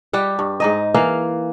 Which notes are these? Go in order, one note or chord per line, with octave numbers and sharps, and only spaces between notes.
G3 G4 F#5
G2
G#2 D#4 D#5
E3 A#3 F5